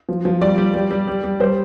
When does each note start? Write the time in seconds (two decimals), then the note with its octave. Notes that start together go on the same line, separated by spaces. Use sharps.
0.09 F3
0.25 F3
0.41 G3 D5
0.58 G3
0.74 G3
0.91 G3
1.07 G3
1.24 G3
1.40 G3 C5